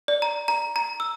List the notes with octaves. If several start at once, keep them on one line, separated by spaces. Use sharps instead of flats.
D5
A#5
A#5
A#5
E6